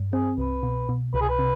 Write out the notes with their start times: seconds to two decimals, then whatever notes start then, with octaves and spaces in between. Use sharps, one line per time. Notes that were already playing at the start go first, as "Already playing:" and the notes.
Already playing: G2
0.13 C4 G#4
0.38 C2 B4
0.63 B2
0.89 B2
1.14 C2 B4
1.21 G#4
1.29 B4
1.39 C3